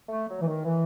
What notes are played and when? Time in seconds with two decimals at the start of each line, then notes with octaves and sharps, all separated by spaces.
0.09 A3
0.28 F#3
0.41 E3
0.47 D#3
0.65 E3